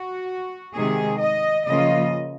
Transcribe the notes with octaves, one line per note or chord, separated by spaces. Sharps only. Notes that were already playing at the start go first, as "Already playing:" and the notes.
Already playing: F#4
C3 D#3 G#3 G#4
D#5
C#3 F3 A#3 F4 D#5